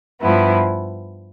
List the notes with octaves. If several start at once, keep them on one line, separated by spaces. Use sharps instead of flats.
G2 F3 B3 E4